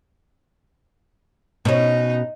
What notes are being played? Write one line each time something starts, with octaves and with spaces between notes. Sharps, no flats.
B2 C#4 D#4